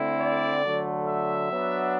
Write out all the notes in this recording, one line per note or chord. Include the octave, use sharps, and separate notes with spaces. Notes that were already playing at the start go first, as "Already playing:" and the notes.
Already playing: D3 A3 C4 E4
D5
D3 F#3 A3
E5
F#3 B3 D4